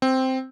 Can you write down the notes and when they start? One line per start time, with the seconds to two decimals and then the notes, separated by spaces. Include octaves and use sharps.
0.02 C4